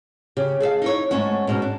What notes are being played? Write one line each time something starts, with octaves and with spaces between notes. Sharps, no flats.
C#3 G4
G#4 A4 E5 F5
D#4 E4 C#5
G#2 A3 C#4 F#5
G#2 B2 C#4
D4